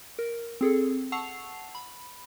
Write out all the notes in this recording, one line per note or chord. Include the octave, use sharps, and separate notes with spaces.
A#4
C4 G#4 A4
F#5 A5 C#6 E6 C7 F7
B5